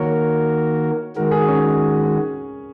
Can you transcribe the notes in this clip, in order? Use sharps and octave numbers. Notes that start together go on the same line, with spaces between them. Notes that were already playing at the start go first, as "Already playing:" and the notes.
Already playing: D#3 A#3 F#4 A#4 C#5
D#3 G#3 F#4 A#4
G#4
C#4